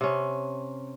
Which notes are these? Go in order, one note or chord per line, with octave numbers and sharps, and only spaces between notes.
C3 C#4